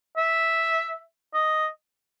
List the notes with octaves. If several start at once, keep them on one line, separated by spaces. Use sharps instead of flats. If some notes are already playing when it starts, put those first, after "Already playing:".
E5
D#5